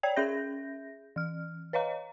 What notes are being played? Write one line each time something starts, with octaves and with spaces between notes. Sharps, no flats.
C#5 D5 G5 G#6
C#4 G#4 E5 G6 A#6
E3 F6
B4 C#5 D#5 F5 A#5